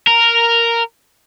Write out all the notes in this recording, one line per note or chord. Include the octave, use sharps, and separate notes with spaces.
A#4